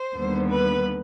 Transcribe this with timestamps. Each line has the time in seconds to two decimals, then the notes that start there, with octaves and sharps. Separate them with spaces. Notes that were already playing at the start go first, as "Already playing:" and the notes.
Already playing: C5
0.15 D#2 D3 G3 B3
0.50 B4